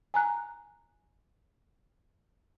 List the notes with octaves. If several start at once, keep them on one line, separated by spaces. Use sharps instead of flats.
G#5 A#5 F#6